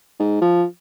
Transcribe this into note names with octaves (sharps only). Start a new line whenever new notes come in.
G#2
F3